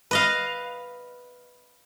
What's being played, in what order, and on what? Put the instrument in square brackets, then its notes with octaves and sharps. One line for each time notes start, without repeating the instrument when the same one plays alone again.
[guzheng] B4 D#5 F5